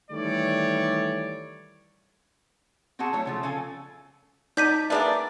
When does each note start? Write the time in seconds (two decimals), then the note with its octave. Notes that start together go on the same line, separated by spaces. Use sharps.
0.10 D#3 E3 G3 A3 C#5 D5
2.99 C4 F#4 G#4 F#5 A5
3.13 F#3 A3 E4 C#5
3.25 C#3 F3 A3
3.43 C#3 A4 F5 G#5
4.57 F#3 D#4 D5 A5 G6 B6 D#7
4.90 F#3 A#3 D4 G#4 B4 D5 E5